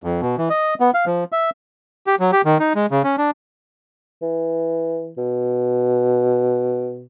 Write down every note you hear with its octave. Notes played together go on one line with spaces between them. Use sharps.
F2
B2
E3
D#5
B3
F5
F3
E5
G4
F#3
G4
D#3
D#4
G#3
C#3
C#4
D4
E3
B2